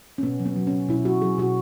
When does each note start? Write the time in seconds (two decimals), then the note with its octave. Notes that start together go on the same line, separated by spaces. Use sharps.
0.18 C#4
0.23 B2 B3
0.40 F#3
0.46 B3
0.56 F#3
0.67 C#4
0.73 B2
0.89 B2 E4
1.05 F#3 F#4
1.22 F#3 G#4
1.38 B2 F#4